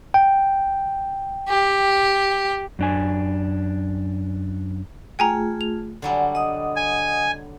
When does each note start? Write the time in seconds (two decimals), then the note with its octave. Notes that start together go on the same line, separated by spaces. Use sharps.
0.14 G5
1.48 G4
2.79 F#2 D4 G#5
5.19 A3 F4 G#4 G5 G#5 A#5
5.61 F7
6.02 D3 F#3 G3 F#5 G#5
6.35 D#5 F#5 D#6
6.76 G#5